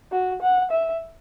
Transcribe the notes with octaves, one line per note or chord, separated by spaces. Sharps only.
F#4
F#5
E5